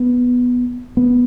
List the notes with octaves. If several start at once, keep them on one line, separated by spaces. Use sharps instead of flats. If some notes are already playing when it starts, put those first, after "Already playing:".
Already playing: B3
B3